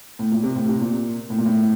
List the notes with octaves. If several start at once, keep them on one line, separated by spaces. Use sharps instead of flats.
A2
A#2
C3
A2
C3
A#2
A2
A#2
A2